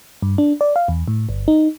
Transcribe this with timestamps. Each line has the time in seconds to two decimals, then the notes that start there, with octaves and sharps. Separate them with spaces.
0.22 G2
0.38 D4
0.61 D5
0.76 F5
0.88 E2
1.08 A2
1.29 G1
1.48 D#4